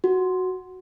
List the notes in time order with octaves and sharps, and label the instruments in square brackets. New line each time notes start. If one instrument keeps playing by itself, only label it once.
[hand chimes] F#4